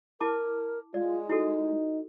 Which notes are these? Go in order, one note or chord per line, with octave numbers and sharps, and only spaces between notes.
E4 A#4 A5 D6
G#3 F4 D5
D#4 E4 F#4 A4